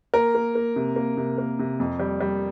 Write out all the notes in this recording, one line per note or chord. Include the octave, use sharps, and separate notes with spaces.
A#3 A#4
A#3
A#3
C3
A#3
C3
A#3
C3
F2
G3
G3